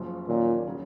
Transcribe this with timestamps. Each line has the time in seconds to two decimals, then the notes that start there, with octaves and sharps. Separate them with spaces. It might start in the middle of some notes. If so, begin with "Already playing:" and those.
Already playing: F#1 F#2 F3
0.27 D#2 A#2 D#3 F#3 C#4 F4
0.67 C#3 F#3